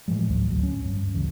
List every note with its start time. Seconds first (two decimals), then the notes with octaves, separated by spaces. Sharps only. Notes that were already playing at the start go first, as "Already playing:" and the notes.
0.08 A2 E3 F3 G#3
0.29 A1 D2 A2 F#3
0.50 D2 F#3
0.63 C#4
0.85 G2
1.14 D2 C#3 E3